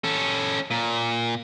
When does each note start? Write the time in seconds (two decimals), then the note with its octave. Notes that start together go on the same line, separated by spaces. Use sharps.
0.04 C#4 A4
0.71 A#2